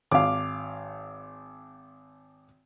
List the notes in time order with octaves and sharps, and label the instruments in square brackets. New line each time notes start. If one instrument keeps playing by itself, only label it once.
[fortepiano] G#1 F5 [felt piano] D6